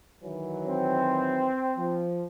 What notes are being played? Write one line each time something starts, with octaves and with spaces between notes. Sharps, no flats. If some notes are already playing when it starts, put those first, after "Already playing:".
D#3 E3 F#3
C4
F3